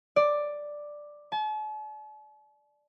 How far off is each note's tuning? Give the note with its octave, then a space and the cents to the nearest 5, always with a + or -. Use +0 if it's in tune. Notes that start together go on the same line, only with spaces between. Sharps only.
D5 +5
A5 -45